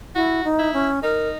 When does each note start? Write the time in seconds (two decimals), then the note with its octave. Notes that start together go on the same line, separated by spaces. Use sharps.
0.15 E4 F#4
0.44 D#4
0.59 E4
0.73 C#4
1.03 D#4 A#4